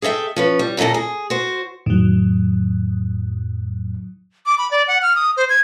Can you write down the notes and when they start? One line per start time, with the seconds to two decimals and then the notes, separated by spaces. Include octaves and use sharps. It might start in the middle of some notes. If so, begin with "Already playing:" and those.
0.02 G#4 A4 D#5 E5 G5
0.36 F3 C#4 B4
0.59 G3
0.77 D#2 A#2 E4 A4 A#4
0.94 G#4
1.30 F#4 C5
1.86 F2 A2 D#3 F#3
4.46 D6
4.58 B5
4.71 D5
4.88 F#5
5.02 F6
5.16 D#6
5.37 C5
5.49 G#6